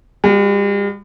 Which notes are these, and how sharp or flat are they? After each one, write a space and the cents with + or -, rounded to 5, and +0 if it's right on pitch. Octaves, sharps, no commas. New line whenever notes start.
G3 +45 F#4 +0